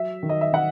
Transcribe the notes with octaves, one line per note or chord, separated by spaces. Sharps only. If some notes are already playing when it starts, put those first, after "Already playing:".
Already playing: F#3 E5
D#3
D#5
E5
D#3 F#5